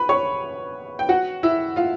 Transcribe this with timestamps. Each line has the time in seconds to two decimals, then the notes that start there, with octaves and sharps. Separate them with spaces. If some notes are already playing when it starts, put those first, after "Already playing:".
Already playing: B4 B5
0.09 C#5 C#6
0.99 G5
1.09 F#4 F#5
1.43 E4 E5
1.76 F4 F5